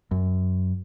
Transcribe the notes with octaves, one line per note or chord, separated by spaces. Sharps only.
F#2